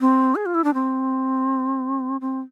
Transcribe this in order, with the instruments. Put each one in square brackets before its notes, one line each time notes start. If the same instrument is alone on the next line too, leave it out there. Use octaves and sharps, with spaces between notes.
[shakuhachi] C4
G#4
F4
E4
D4
C4
C4